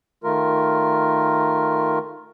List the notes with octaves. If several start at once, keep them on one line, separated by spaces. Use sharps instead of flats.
D#3 A3 F4 A#4